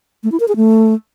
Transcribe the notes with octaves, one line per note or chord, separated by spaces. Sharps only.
A3
E4
A#4
G#4
A3